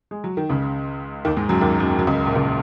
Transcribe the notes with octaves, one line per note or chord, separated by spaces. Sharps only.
G#3
F#3
D#3
C#2 C#3
D#2 D#3
G#2 G#3
F#2 F#3
D#2 D#3
F#2 F#3
F#2 F#3
C#2 C#3
A#1 A#2
C#2 C#3